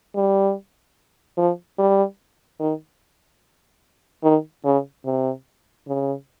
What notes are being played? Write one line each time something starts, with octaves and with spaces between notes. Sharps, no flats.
G3
F3
G3
D#3
D#3
C#3
C3
C#3